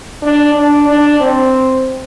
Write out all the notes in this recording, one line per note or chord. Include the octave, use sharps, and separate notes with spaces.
D4
D4
D4
C4